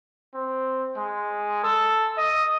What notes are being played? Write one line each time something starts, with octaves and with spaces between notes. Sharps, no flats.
C4
G#3
A4
D#5